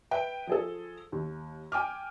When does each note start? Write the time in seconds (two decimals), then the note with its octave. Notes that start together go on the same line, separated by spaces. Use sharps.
0.11 B4 E5 G5
0.47 F3 G#4 A4
1.12 D#2
1.72 G5 G#5 D6 F6